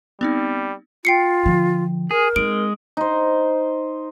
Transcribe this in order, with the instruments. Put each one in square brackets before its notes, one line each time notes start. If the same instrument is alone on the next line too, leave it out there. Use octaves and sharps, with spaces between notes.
[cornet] G3 [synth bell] B3 C4 D#4
[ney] F4 [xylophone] G5 C7 C#7
[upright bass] D3 F3
[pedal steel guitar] G#4 [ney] A#4
[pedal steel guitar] G#3 [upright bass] C4 D#4 [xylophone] D7
[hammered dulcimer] D#4 C5